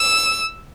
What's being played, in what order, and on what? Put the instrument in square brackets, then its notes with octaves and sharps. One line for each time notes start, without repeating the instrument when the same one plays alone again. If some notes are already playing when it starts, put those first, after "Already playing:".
Already playing: [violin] E6